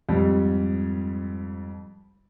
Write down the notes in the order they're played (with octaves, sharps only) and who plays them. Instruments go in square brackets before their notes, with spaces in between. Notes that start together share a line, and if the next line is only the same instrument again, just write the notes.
[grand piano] F2 G#2 G3